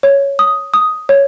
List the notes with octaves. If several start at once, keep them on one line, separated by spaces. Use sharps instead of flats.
C#5
D#6
D#6
C#5